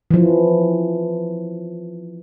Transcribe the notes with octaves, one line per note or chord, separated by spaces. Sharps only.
E3 F3